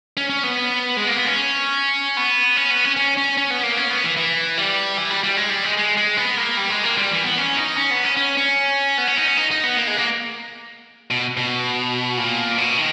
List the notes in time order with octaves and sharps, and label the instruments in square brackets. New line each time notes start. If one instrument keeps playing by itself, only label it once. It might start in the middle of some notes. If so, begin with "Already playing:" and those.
[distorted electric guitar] C#4
C#4
B3
G#3
A#3
B3
C#4
B3
C#4
B3
C#4
C#4
C#4
C#4
B3
A#3
C#4
B3
E3
E3
G3
E3
G3
G3
G#3
G3
G#3
G#3
G#3
B3
A#3
G3
G#3
A#3
G3
E3
B3
C#4
D#4
C#4
B3
C#4
C#4
C#4
B3
C#4
D#4
C#4
D#4
D#4
B3
A#3
G#3
A#3
B2
B2
A#2
B2
D#3